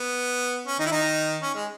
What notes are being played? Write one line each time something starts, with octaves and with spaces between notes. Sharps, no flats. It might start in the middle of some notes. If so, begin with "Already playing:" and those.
Already playing: B3
C#4
D#3 D#4
E4
D#3 D#4
C#4
G#3